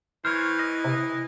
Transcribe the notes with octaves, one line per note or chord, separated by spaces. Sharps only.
E3 C5 C#5 F6
D#5
C3